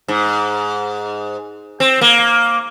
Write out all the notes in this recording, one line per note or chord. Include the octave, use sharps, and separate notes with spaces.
G#2
C4
A#3